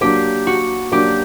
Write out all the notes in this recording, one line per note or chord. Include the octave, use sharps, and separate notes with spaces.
F#3 A#3 D4 G4
F#4
F#3 A#3 D4 G4